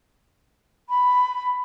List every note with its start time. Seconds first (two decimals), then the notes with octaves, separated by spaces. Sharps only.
0.88 B5